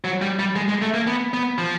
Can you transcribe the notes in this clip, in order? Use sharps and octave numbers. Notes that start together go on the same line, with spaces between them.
F#3
G3
G3
G#3
G#3
A3
A#3
B3
B3
F3